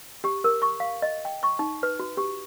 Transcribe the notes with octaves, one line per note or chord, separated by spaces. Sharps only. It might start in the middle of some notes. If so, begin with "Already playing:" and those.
G4
A#4
C#6
F5
D#5
G5
C#6
D#4
B4
F#4
G4